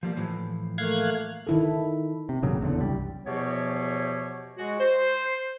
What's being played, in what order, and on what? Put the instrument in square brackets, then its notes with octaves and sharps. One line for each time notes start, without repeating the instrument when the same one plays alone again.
[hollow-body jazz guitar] F3 G3 A#3
A2 E3 F3
[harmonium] A3 A#3 [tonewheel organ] F5 F#6 G#6
[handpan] D#3 E4 A4
[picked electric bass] C3
G#1 A#2 C#3 F#3
F#1 E2 D3
C2 G3
[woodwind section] E2 B2 F3 B3 G4 C#5
G#3 F#4
C5